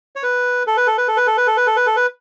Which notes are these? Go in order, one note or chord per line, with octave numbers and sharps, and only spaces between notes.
C#5
B4
A4
B4
A4
B4
A4
B4
A4
B4
A4
B4
A4
B4
A4
B4